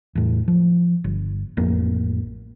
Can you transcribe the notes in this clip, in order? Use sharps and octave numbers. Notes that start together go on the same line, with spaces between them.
E2 A2
F3
G1
A1 F2 A#3